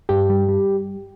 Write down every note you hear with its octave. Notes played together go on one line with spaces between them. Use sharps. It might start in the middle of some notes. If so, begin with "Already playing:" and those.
G2 G4
G3
G3